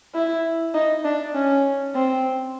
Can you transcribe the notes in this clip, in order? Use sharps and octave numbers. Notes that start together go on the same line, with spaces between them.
E4
D#4
D4
C#4
C4